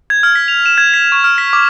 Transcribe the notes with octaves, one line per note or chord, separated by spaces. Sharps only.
G#6
F6
B6
F7
E7
G#6
B6
C#6
F6
B6
D6